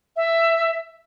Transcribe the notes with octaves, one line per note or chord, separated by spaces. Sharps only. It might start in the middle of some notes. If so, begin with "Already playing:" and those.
E5